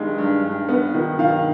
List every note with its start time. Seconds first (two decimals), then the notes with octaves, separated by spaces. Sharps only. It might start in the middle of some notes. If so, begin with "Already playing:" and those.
Already playing: G2 D#3 G#3
0.18 G2
0.44 G2
0.69 B3
0.94 D#3
1.19 D#3 F5